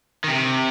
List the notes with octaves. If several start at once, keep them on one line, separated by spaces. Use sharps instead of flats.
D#3
C3